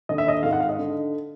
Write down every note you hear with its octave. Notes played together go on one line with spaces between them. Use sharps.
D#2 D3 D#5
E5
D#5
G#1 G#2 D#3 F5
F#5
F5
D#5
D3